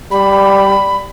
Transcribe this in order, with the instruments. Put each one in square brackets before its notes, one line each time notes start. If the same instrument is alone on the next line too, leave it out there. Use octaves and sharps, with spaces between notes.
[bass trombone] G3 [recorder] B5